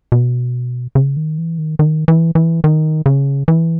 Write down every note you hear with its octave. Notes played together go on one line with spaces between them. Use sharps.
B2
C#3
D#3
E3
D#3
D#3
E3
E3
D#3
C#3
E3